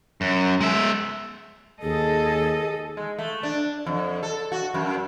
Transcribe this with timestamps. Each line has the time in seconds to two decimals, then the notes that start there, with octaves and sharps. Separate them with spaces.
0.21 F#2
0.61 G#3 E5
1.82 D#2 G#4 A4 D#5
2.97 G#3
3.19 A3
3.43 D4
3.86 F2
4.23 A4
4.52 F#4
4.74 F#2